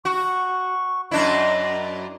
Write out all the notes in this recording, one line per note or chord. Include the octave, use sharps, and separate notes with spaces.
F#4 C#6
F#2 D4 E4 D#5